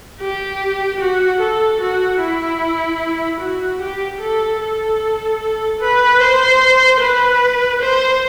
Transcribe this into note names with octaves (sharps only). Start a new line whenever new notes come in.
G4
F#4
A4
F#4
E4
F#4
G4
A4
A4
B4
C5
B4
C5